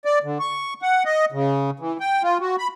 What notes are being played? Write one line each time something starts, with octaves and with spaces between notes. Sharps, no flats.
D5
D3
C#6
F#5
D#5
C#3
E3
G5
F4
F#4
B5